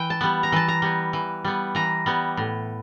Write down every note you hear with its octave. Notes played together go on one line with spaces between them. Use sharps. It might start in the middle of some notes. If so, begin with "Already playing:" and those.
Already playing: E3 G5
A5
G3 B3
A#5
E3 A5
A#5
G3 B3
E3
G3 B3
E3 A#5
G3 B3
A2